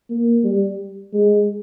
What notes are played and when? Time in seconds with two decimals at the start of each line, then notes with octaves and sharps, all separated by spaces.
0.10 A#3
0.44 G3
1.14 G#3